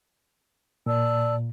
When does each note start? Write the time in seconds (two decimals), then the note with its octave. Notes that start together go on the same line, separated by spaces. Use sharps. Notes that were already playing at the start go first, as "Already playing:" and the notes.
0.86 A#2 D5 A5 E6